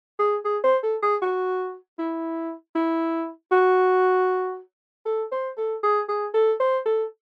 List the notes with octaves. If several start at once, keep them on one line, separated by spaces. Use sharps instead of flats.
G#4
G#4
C5
A4
G#4
F#4
E4
E4
F#4
A4
C5
A4
G#4
G#4
A4
C5
A4